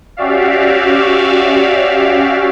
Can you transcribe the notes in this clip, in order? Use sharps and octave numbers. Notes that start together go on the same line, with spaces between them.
C#4 F#4 G4 D5 E5 F5